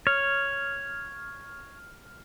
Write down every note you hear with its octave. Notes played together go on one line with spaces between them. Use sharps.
C#5 F6